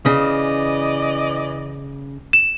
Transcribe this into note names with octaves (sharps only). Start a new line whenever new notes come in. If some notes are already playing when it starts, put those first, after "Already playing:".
C#3 E3 D5 D#5
E7